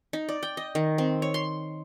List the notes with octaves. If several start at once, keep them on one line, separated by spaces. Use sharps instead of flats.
D#4
D5
G5
D#5
D#3
C4
C#5
C6